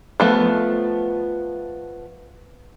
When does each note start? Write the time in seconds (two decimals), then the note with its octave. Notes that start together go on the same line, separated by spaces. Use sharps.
0.20 F3 A3 B3